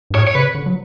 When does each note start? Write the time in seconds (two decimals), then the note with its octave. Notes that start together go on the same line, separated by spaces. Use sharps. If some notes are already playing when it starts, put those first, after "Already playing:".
0.10 G2
0.15 A2 C#5
0.27 C#5
0.35 C#3 B4
0.55 D3
0.66 F#3